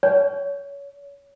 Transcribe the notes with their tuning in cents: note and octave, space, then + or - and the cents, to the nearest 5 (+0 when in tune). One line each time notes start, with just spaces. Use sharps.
C#5 +25